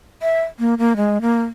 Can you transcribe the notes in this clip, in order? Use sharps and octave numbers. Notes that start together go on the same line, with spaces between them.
E5
A#3
A#3
G#3
A#3